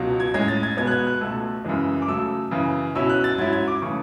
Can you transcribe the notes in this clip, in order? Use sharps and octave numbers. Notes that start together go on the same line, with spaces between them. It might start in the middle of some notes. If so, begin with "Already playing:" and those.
Already playing: C#2 B2 F#3
G#6
A2 G#3 C#4 G#6
A6
G#6
B2 G#3 B3 G#6
F#6
G#6
F#6
C#2 B2 A3 E6
F#2 C#3 E3 G#3
D6
C#3 F#3 A3 E6
F#2 C#3 E3
B2 F#3 C#4 E4 E6
F#6
A6
G#2 F#3 C#4 E4 G#6
G#6
D6
C#3 E3 A3 C#6